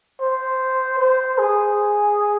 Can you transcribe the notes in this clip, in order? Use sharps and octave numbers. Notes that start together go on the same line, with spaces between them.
C5
C5
G#4